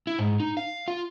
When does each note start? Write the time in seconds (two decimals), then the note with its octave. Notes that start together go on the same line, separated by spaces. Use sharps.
0.07 E4
0.19 G#2
0.40 D#4
0.57 F5
0.88 F4